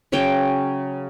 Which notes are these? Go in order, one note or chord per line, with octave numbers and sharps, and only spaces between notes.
C#3 F#3 C#5 G5